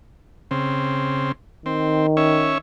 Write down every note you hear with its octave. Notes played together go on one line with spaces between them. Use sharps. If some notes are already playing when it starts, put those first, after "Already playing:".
C#3 C4
D#3 C4
C#4 C#5 E5